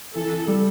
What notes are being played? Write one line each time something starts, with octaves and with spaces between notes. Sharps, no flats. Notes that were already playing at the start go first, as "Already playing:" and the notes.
E3 A4
E3
G3